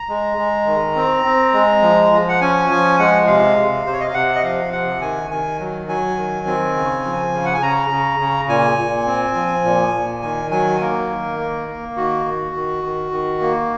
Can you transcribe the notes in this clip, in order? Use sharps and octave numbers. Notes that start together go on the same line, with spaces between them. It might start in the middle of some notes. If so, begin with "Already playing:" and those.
Already playing: A#5
G#3
G#3
D#3
C4
C4
G#3
F3
F3
F#5
C#4 G#5
F3 G#5
G#3 F#5
C3 F5
C3
C3 C5
C#5
D#5
F5
C3 F#5
D#5
F3 F5
C3 F#5
D#3 G#5
D#3 G#5
F#3
F#3 G#5
D#3
C4
C#3
F3
C#3
F#5
G#5
C#3 A#5
C#3
C#3
A#2 G#5
A#2
C4
F3
A#2
A#2
D#3 G#5
F#3 G#5
A#3 A#4
D#3
A#3
A#3
D#3 F#4
D#3
D#3
D#3
D#3
A#3